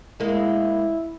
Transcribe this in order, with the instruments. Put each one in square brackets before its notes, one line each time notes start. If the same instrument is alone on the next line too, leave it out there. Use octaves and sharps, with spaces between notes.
[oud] G#3 A#3 [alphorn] E4